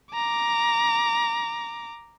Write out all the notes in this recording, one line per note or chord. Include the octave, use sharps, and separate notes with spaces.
A#5 D6